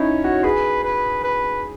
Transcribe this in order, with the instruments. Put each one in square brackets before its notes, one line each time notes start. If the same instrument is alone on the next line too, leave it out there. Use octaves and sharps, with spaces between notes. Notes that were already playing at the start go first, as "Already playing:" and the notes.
Already playing: [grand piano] C#4 D#4 E4 [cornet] C#5
[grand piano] F#4
[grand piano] G#4 [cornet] B4
[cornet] B4
B4